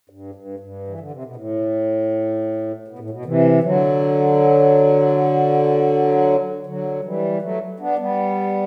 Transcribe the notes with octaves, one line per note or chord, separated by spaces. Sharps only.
G2
G2
G2
E3
D3
C3
B2
A2
B2
A2
B2
C3 E3
D3 F#3
D3 F#3
E3 G3
F#3 A3
B3 D4
G3 B3